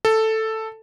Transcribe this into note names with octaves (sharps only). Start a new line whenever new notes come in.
A4